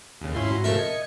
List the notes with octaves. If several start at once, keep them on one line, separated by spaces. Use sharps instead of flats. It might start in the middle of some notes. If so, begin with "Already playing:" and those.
D#2 C#3
G#2 C#4 E4 F4 C6
G#2 F#4 A#5
C#3 F3 A3 A#4 E5 A5
D#5 G#6 C#7